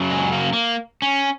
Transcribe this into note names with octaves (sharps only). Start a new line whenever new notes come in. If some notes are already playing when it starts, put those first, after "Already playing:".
Already playing: F#2 C#3 F#3
G#3
A#3
A#3
C#4